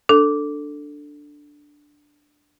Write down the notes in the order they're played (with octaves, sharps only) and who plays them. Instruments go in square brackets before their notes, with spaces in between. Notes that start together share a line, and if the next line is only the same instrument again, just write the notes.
[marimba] D4 [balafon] A4